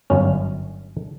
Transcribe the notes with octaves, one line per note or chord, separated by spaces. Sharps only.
G1 F#2 C#4